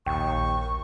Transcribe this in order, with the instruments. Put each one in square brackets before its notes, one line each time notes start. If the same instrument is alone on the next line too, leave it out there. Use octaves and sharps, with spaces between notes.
[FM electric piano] A#1 G5 [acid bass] D#2 [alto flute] C#6